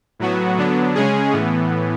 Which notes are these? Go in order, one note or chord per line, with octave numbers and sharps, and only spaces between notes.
A2 F#3 B3 F#4
D3 F#3 B3 D4
C#3 G#3 C#4 G#4
A2 E3 B3